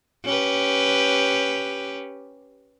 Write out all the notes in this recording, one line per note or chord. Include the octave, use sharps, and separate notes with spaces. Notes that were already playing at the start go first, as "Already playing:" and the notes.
C#4 G4 B4